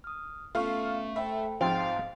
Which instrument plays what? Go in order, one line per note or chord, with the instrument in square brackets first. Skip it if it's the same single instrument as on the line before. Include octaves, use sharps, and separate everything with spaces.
[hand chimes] D#6 F6
[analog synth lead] A3 [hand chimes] B3 C#4 C#6 [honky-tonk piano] F4 F5
[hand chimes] C5 G5 B5 [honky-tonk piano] E5
[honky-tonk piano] G#2 F3 [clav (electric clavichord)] C4 [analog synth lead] F5 [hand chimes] C6 A6 D7